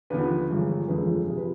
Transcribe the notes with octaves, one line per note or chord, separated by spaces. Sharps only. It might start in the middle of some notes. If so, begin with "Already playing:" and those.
D#2 D3 F3 B3 B4
G1 G2 F3 G#3
G1 F2 D3 F3 G#3 B4
C3 F3 G#4
B4